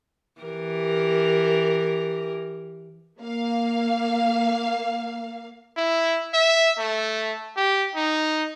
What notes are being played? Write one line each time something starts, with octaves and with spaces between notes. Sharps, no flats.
E3 G4 A#4
A#3 F5
E4
E5
A3
G4
D#4